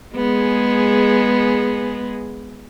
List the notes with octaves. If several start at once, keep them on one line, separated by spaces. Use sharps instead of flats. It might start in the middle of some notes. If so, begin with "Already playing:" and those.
G#3 B3 G#4